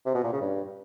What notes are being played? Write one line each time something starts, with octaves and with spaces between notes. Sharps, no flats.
C3
B2
A#2
C#3
G2